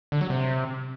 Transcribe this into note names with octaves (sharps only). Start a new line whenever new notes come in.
D3
F#3
C3